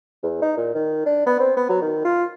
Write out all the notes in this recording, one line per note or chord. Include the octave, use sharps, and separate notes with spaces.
E2
D#4
A#2
D#3
D4
B3
C4
B3
F#3
D#3
F4